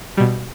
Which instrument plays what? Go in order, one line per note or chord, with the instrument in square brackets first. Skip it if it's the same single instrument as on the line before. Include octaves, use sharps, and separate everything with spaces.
[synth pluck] B2 G3